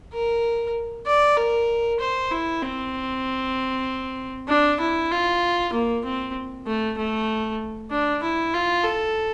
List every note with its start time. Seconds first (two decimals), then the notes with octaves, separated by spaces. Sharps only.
0.13 A#4
1.07 D5
1.37 A#4
2.00 C5
2.31 E4
2.62 C4
4.48 D4
4.80 E4
5.11 F4
5.72 A#3
6.05 C4
6.66 A3
6.97 A3
7.90 D4
8.23 E4
8.54 F4
8.84 A4